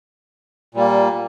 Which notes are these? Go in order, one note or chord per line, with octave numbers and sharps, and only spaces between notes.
A#2 G3 A#3